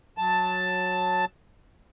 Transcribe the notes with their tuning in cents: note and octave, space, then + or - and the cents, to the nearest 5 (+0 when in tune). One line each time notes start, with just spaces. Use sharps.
F#3 -15 A5 +5